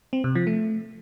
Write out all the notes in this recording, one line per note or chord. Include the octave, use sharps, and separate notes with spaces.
C4
C3
F3
A3